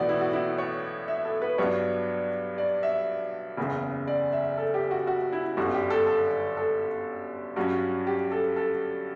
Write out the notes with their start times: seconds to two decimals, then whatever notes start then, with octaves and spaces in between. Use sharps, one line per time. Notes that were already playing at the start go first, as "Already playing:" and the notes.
Already playing: B1 A2 E3 B3 F#4 D5
0.09 E4
0.21 F#4
0.33 E4
0.58 C#5
1.08 E5
1.25 A4
1.42 B4
1.58 G2 F#3 B3 D4 C#5
2.58 D5
2.83 E5
3.57 F#1 E2 C#3
4.08 D5
4.33 E5
4.57 A4
4.74 G4
4.91 F#4
5.07 F#4
5.33 E4
5.57 G1 F#2 D3 G3 F#4
5.74 G4
5.90 A4
6.07 A4
6.57 A4
7.56 G2 F#3 C#4 F#4
8.07 G4
8.32 A4
8.56 A4